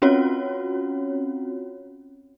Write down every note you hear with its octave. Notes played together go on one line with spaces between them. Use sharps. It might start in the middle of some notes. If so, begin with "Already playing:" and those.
C4 C#4 F4 F#4 C#5